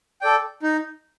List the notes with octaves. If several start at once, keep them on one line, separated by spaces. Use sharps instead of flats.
A4 D5 G5
D#4